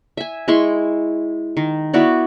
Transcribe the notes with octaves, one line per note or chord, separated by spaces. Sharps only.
E5 G#5
G#3 E4 C6 C#6
D#3
B3 E4 F#4 D5